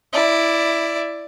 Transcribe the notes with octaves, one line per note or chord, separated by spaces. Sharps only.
E4 D5